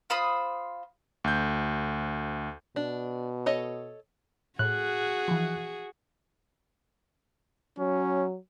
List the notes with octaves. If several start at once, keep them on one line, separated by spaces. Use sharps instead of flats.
F4 C5 B5 D#6
D2 G6
B2 D4
A4 C#5 D#5
A2 F#4 G#4 F#6
E3 F3
F#3 C#4